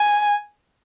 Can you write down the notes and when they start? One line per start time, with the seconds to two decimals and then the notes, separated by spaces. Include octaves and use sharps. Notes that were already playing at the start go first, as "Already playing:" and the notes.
Already playing: G#5